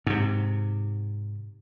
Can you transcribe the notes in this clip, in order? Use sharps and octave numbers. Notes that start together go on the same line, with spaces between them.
G#2 C3